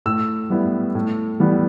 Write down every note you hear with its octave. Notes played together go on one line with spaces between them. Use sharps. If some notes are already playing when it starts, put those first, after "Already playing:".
A2 E6
G3 B3 E4
A2
E3 G3 B3